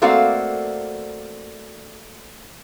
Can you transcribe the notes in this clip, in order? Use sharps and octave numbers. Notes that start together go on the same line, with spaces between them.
A3 A#3 C4 F#4 D5 F5